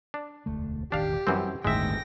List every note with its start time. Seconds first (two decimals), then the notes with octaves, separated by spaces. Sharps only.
0.14 D4
0.46 E1 D2 A3
0.92 E1 A1 D#3 D4 G4 F5
1.27 F#2 E3 G3 C4 C#4
1.65 G1 D2 A2 D#3 G#3 E5 G5 A#6